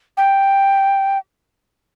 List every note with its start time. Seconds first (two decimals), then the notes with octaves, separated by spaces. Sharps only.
0.17 G5